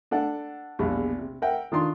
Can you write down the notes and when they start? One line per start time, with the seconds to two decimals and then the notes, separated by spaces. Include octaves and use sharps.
0.11 D4 A4 F#5
0.79 A#1 E2 B2 G3
1.19 C3
1.42 A#4 E5 F#5 G5
1.72 D#3 D4 F4 C6